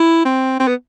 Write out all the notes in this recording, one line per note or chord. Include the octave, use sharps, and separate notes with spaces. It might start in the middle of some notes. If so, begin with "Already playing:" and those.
Already playing: E4
C4
C4
B3